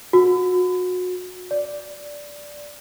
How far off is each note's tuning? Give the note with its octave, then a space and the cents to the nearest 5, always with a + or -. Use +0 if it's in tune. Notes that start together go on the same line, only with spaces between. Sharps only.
F#4 -30
D5 -5